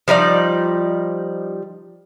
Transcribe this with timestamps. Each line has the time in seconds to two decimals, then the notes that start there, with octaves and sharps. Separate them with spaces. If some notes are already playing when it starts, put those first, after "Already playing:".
0.08 F3 G3 D#4 D5